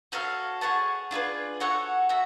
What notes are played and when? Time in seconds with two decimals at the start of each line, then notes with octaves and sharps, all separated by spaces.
0.12 F#4 A4 C#5 F5
0.61 G#4 C#5 F#5 A5
1.11 D4 F4 G#4 B4
1.60 F#4 A4 C#5 F#5
2.09 F#4 E5